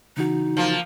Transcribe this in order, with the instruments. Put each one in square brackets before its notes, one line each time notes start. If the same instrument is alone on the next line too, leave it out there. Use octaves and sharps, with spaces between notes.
[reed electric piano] C#3 E3 F#4 [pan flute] D#4
[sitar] F3 A#3